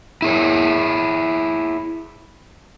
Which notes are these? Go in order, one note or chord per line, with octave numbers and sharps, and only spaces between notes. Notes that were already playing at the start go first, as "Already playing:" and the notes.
E4 G#4 C#5